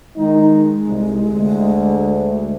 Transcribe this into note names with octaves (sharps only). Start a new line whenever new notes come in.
D#3 G#3 D#4
C2
D2